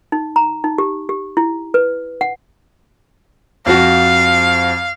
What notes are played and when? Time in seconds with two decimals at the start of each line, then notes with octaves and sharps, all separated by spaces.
0.12 D#4
0.36 A#5
0.64 D#4
0.78 G4
1.09 G4
1.37 E4
1.74 B4
2.21 F#5
3.66 F2 F3 F#4 F5